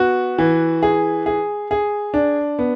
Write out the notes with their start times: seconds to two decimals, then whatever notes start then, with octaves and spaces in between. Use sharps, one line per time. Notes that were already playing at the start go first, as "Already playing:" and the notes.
Already playing: B3 F#4
0.38 E3
0.83 G#4
1.26 G#4
1.71 G#4
2.14 D4
2.59 B3